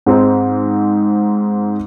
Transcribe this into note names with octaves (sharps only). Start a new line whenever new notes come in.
G#2 G#3 C4 D#4